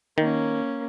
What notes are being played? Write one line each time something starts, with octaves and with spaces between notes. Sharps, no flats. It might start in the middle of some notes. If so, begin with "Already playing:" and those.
D#3 A#3 C#4